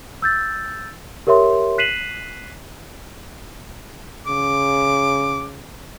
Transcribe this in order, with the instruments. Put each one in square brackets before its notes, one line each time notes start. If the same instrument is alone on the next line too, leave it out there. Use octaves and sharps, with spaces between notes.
[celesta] E6 G6 A6
G4 A#4 C#5 E5 C6
F#6 B6 C7 D#7 E7 F#7
[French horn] C#3 [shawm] D6